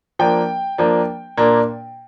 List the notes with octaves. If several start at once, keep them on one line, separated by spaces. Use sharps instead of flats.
F3 A#3 D4 G5
F3 A#3 D4
A#2 A#3 D4